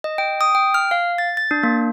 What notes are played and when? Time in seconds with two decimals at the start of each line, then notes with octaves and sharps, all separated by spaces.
0.04 D#5
0.18 G5
0.41 D#6
0.55 G5
0.74 F6
0.91 F5
1.18 A6
1.37 A6
1.51 D4
1.63 A#3